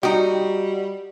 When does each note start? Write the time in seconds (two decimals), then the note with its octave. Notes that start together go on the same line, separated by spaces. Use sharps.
0.03 G3 D#4 F#4 G5